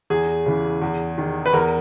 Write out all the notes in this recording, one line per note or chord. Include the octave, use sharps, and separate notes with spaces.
E2 G#4
C#3 E3
E2
D#3
B4
E2 A#4